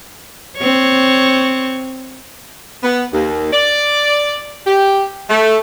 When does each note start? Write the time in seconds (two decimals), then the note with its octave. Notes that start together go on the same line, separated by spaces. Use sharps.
0.57 C4 C#5
2.83 B3
3.13 D#2
3.53 D5
4.67 G4
5.30 A3